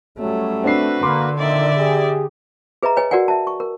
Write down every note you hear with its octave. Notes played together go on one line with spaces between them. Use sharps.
F#3 G3 A3 C#4
C4 D4 F#4 B4 C7
D3 A#3 B5 C6 D6
F2 A#2 D#3 D5 E5
G4 G#4
G#4 B4 D#5 E5 A#5
B4 C#5 D#5 G#5
F#4 A#4 D5 F#5 G#5
E5 A5
C#6
A#4